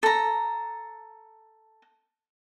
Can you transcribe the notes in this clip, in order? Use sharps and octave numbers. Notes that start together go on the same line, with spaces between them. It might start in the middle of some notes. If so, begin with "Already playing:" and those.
A4 A#5